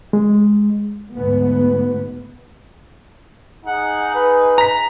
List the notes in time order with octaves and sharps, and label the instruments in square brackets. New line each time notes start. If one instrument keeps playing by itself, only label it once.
[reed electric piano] G#3
[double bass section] D2 G#2 B3
[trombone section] D#4 G#4 [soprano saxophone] F#5
[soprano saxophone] B4
[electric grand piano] A#5 B6